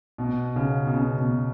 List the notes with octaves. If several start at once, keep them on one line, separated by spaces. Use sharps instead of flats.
B2
C#3
B2
C#3
B2